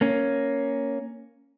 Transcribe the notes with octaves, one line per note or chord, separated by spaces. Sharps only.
A#3 C#4